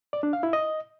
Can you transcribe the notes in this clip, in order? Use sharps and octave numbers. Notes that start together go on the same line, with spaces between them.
D5
D4
F5
E4
D#5